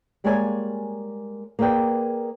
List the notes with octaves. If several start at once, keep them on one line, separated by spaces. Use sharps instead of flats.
G3 G#3 A#3 C#5 D5 G#5
A#3 G#4 B4 D5 G5